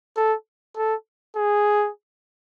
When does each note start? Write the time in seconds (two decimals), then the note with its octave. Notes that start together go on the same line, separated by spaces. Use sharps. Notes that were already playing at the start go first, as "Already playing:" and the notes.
0.16 A4
0.76 A4
1.36 G#4